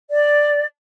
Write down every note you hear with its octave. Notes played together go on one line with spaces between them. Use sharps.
D5